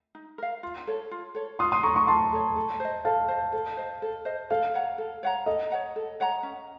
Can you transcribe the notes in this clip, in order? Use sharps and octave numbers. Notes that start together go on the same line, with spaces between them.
D#4
A#4 F5
F4
A4 C#5
F4
A4 C#5
F4 C6 D#6
C6 D#6
A4 C#5 A#5 C#6
A#5 C#6
F4 A5 C6
A4 C#5
A4
C5 D#5
A4 F5 A5
C5 D#5
A4
C5 D#5
A4
C5 D#5
A4 F5
C#5 F#5 A#5
A4
C#5 F#5 A#5
A4 D#5
C#5 F#5 A#5
A4
C#5 F#5 A#5
C#4